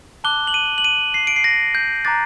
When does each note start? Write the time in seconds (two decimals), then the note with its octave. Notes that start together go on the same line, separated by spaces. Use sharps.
0.24 A5 D6 F#6 G7
0.47 F#7
0.54 D#7
0.78 F#7
0.84 D#7
1.14 C7
1.27 D7
1.36 C7
1.44 A#6
1.75 G6
2.05 A#5 D6 F#6 A6